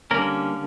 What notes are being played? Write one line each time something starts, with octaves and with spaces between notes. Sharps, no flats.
D3 G3 A#3 C#4 A#4